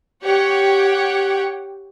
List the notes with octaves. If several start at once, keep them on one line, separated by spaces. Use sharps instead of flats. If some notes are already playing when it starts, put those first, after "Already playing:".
G4 C#5 F#5 G5